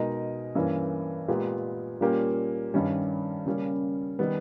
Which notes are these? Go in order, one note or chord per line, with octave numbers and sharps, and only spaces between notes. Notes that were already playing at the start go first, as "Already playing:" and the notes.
Already playing: B2 G#3 D#4 A#4 D#5
G2 E3 A#3 C#4
A#2 G#3 B3 G4 A#4
A#2 G3 A#3 C#4 G4
G2 D#3 G3 C#4
C#3 G3 A#3 C#4
D#3 G3 B3